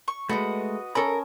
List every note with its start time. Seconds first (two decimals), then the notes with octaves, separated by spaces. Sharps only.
0.08 C#6
0.29 G#3 A3 F#4 B4 D#5
0.95 C#4 A4 A#4 A5 B5